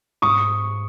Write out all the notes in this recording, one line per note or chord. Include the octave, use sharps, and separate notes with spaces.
G#2 C#6 D#6